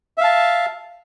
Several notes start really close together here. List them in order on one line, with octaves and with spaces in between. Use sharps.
E5 F5 A5